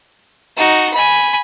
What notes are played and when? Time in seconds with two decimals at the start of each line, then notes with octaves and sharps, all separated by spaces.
0.57 D#4 F#4
0.93 G#5 B5